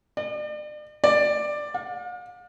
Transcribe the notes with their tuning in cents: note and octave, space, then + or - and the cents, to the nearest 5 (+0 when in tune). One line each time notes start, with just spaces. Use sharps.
D5 +40
D5 +10
F5 +45